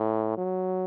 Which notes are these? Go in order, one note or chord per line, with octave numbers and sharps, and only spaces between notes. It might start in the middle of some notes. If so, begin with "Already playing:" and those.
Already playing: A2
F#3